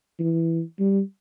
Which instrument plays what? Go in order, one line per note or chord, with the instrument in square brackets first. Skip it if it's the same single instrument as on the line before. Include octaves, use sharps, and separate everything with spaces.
[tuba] E3
G3